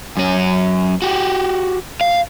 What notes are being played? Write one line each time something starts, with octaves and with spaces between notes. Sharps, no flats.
F#2 C#4
F#4 G4
F5